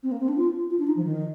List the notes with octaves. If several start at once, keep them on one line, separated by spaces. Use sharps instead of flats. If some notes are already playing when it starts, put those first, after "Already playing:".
C4
A#3
C4
D4
F4
F4
D4
D#4
F3
D#3